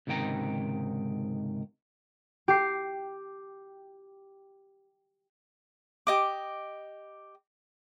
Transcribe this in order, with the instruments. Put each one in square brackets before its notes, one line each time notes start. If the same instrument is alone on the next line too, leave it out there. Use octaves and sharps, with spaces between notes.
[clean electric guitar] C#2 G#2 C3 D#3 G5 A#5
[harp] G4 C7
[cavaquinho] G4 D#5 D6